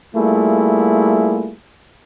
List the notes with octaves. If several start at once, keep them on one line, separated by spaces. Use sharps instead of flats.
G3 A3 A#3 E4 F4 G#4